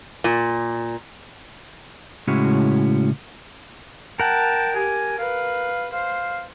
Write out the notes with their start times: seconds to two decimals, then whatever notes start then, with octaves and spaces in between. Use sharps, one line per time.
0.24 A#2
2.27 A2 C#3 G#3 C#4 E4 F#4
4.20 A#4 F#5 G5 A5
4.75 G4 G#5
5.19 B4 F5
5.93 C5 F5